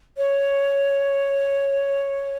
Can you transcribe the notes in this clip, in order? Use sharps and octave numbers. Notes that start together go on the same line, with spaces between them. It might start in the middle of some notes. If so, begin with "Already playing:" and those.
C#5